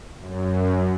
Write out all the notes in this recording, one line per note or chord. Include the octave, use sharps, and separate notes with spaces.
F#2